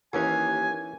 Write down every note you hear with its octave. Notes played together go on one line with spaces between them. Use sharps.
D#2 E3 C#4 G#5